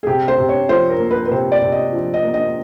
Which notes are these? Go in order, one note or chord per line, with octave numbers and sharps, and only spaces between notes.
G#4
C3 G4
C5
C3
C#5
F3 C5
A#4
A#3
B4
B4
C3 C5
D5
C3
D#5
F3
D#5
A#3
D#5